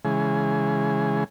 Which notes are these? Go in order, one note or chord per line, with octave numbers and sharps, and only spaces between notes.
C#3 E3 G#3 G#4